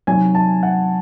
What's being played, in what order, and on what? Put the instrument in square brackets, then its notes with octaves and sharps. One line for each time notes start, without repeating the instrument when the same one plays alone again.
[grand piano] C3 D#3 F#3 G#5
A5
F#5